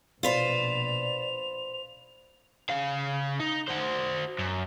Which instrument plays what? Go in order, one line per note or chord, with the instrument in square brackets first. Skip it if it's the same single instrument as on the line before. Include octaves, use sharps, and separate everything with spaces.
[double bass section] A#1 B2 [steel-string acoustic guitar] F4 B4 C5 [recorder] D5 [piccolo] F7
[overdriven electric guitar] C#3 F5
D#4
F#4 C5
F#2